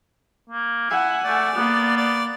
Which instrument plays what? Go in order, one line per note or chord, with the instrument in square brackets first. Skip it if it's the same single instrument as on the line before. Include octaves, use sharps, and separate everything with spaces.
[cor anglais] A#3
[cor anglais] E4 [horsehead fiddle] F#5 G#5
[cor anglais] A3 [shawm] D5
[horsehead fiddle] A#3 [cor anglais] B3
[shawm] D5